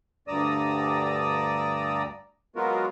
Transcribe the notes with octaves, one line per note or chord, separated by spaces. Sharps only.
D2 G2 D5 A#5 D#6 E6
F#3 G#3 B3 F4 F#4 A#4